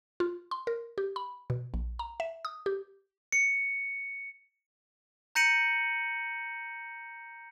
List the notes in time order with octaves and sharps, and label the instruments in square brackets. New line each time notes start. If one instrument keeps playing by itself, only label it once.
[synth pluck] F4
C6
A#4
G4
B5
B2
A#1
A#5
E5
D#6
G4
[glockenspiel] C#7
A#5 G6 A#6 C#7 D#7 F#7